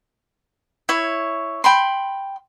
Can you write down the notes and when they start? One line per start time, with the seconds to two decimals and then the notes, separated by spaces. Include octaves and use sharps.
0.89 E4 C#5
1.64 G5 B5 C6